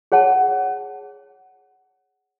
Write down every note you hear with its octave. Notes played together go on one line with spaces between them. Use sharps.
G#4 C#5 F#5 A5